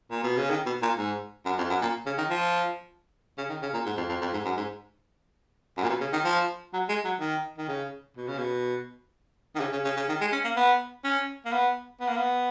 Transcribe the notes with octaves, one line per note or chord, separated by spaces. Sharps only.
A#2
B2
C#3
D#3
B2
A#2
G#2
F#2
F2
F#2
A#2
C#3
D#3
F3
C#3
D#3
C#3
A#2
G#2
F2
F2
F2
G#2
F#2
G#2
F#2
A#2
B2
C#3
D#3
F3
F#3
G#3
F#3
D#3
D#3
C#3
B2
C#3
B2
D#3
C#3
C#3
C#3
C#3
D#3
G#3
C#4
A#3
B3
C#4
A#3
B3
B3
A#3
B3